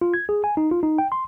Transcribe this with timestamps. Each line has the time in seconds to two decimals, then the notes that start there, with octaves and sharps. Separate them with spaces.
0.01 F4
0.14 G#6
0.29 G#4
0.44 G#5
0.57 D#4
0.71 F4
0.83 D#4
0.98 G5
1.12 C6